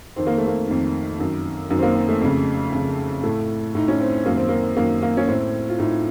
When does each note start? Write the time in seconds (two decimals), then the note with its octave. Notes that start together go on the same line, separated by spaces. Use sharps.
0.16 F2 D#3 C4
0.27 A#3
0.38 A3
0.47 A#3
0.68 F2 D#3
1.19 F#2 D#3
1.70 F#2 D#3
1.79 C4
1.83 A#3
1.96 C4
2.08 A3
2.21 F2 C#3
2.72 F2 C#3
3.23 A2 A3
3.75 A2 D#4
3.88 C#4
4.00 C4
4.26 F#2 D#3 A#3
4.36 C4
4.49 A#3
4.77 F#2 D#3 A#3
5.02 A#3
5.17 C#4
5.28 A2 C4
5.69 F4
5.79 A2 D#4